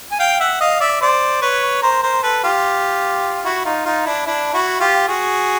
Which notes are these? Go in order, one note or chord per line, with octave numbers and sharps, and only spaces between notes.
G#5
F5 G5
E5 F#5
D#5 F5
D5 E5
C5 D5
B4 C#5
A#4 C5
A#4 C5
A4 B4
F4 G4
E4 F#4
D#4 F4
D#4 F4
D4 E4
D4 E4
E4 F#4
F4 G4
F#4 G#4